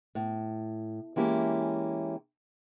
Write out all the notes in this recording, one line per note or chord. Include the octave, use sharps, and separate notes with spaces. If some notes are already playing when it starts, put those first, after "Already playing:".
A2
E3 G#3 A#3 C#4 E4 G4